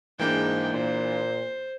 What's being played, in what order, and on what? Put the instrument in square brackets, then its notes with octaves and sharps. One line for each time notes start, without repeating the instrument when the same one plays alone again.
[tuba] G#2 [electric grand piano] E3 A#3 D4 [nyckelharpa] G#4 G5
[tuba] A#2 [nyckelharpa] C5